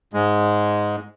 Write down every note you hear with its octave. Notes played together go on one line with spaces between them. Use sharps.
G#2 G#3